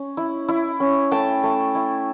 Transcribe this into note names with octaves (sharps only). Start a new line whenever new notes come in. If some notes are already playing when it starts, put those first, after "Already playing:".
Already playing: C#4
E4
E4
C#4
A3 G5 A5
A3
E4